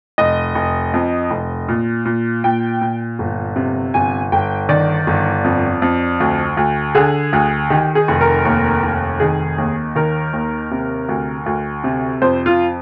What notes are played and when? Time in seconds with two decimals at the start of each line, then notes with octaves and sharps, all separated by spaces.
0.18 F1 D#5
0.55 F1
0.94 F2
1.30 F1
1.69 A#2
2.05 A#2
2.44 A#2 G5
2.81 A#2
3.19 G1
3.56 C3
3.94 G1 G#5
4.32 G1 G5
4.69 D#3 D5
5.07 G1
5.44 F2
5.82 F2
6.20 D2
6.57 D2
6.95 D3 G#4
7.33 D2
7.70 D#3 G4
7.95 G#4
8.08 F1
8.21 A#4
8.45 D#2
8.83 F1
9.20 D#3 G#4
9.58 D#2
9.95 D#3 A#4
10.33 D#2
10.71 C3
11.09 D2
11.46 D2
11.84 C3
12.22 F2 C5
12.46 F4